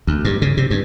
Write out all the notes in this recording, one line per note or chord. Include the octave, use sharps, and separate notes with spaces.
D2
G2
C#3
C3
G2